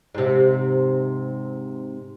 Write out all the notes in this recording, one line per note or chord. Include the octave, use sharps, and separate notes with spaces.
G#2 C3